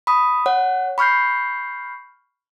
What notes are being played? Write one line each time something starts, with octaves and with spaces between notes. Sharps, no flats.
B5 D#6
C#5 F#5
B5 C#6 F6 G6 C7